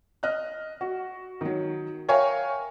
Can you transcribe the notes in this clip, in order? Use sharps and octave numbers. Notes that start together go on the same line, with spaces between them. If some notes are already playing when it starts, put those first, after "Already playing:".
D#5 F6 F#6
F#4
D#3 F#3
A#4 C#5 E5 F5 G5 G#5